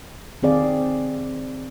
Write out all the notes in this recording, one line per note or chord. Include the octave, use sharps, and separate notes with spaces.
D#3 C4 G#4 D5 F5